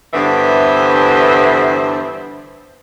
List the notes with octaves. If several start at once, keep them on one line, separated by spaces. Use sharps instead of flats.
G2 D3 E3 B3 C5 E5